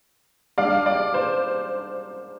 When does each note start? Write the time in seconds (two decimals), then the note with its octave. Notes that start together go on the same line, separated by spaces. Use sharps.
0.58 G#2 G3 D4 D5 F5
0.86 D5
1.14 C5